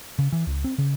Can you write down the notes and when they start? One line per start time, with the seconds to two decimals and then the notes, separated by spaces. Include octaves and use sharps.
0.19 C#3
0.32 E3
0.47 C#2
0.64 C4
0.78 C#3